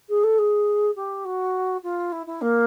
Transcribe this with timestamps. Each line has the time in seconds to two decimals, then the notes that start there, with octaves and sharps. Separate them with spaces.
0.09 G#4
0.23 A4
0.38 G#4
0.96 G4
1.25 F#4
1.83 F4
2.12 E4
2.26 E4
2.41 A#3